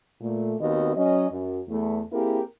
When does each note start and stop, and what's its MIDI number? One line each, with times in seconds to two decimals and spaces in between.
0.21 0.54 46
0.21 0.54 57
0.60 0.92 39
0.60 0.92 51
0.60 0.92 59
0.60 0.92 60
0.60 0.92 66
0.60 0.92 75
0.97 1.29 54
0.97 1.29 61
0.97 1.29 75
1.31 1.60 42
1.69 2.00 40
1.69 2.00 57
2.12 2.41 58
2.12 2.41 60
2.12 2.41 64
2.12 2.41 67
2.12 2.41 68
2.12 2.41 70